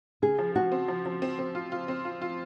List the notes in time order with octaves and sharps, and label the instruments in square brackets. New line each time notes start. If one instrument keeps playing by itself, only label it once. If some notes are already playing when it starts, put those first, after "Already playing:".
[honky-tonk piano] C#3 [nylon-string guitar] G#4
[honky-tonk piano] F3
[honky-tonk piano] F3 [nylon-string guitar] F#4
[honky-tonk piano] C4
F3
F3
C4
C4
F4
F4
C4
F4
F4